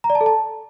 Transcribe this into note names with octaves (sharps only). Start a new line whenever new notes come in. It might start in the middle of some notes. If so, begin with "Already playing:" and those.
A#5
D5
A5
A4
A5